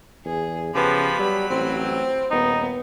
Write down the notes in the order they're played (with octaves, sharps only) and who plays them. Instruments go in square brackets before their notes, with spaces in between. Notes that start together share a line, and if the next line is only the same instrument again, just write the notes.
[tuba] E2 [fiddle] G#4
[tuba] C#3 [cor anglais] F3 [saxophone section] B3 G4 B4 [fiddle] B5
[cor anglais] F#3 [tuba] G3
[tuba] A1 [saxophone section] C4
[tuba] D#1 [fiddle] B3 [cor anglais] D#4